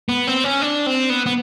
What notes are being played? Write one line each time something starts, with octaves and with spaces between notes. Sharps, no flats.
B3
C4
C#4
D4
C4
B3
B3